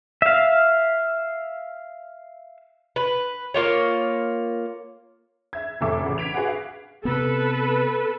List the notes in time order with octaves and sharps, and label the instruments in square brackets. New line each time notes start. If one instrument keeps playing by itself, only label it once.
[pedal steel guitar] E5 F5
[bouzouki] B4
A#3 F4 C#5
[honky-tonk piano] E5 G#6
F1 A2 F3 A4 E5 D6
A1 C#3
G#6 B6 D7 F7
F#4 G#4 B4 F#5
F5
[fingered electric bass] C3 B3 [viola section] A4 B4